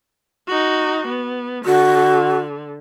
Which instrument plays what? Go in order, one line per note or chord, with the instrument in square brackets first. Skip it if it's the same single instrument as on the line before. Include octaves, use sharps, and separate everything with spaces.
[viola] D#4 F#4
B3
[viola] D3 [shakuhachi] F#4